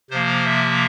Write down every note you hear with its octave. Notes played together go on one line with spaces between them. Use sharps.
C3 F3 A#3 C5
E5